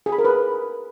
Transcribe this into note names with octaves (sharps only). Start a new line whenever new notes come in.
G#4
B5
A#4
B4